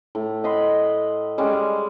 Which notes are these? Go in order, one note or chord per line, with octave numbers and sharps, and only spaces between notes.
A2
D#5 F#5 B5 C6
G3 G#3 C#4